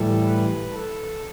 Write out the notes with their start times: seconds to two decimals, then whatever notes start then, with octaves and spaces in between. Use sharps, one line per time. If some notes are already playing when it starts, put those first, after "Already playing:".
Already playing: A2 E3 G3 A4
0.26 B4
0.73 A4